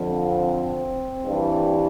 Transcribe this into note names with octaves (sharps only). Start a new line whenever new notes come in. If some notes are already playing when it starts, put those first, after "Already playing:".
Already playing: F2 D3 F3
C4
G2 E3 G3